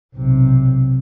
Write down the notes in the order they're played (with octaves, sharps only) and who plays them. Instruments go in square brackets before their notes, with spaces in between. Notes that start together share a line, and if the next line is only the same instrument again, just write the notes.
[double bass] B1 C3